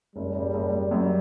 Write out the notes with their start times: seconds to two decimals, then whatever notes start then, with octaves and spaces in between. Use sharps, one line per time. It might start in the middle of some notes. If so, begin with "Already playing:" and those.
0.15 F#1 G3
0.34 F#1
0.53 F#1
0.72 F#1
0.91 F#2